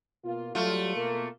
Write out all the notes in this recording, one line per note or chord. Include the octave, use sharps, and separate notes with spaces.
B2 A#3 F4
F#3 G3 A3 F4
B2 A#3 A#4